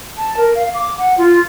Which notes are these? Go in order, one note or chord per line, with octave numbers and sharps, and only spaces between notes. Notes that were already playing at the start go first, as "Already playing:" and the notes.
A5
A#4
F5
D6
F#5
F4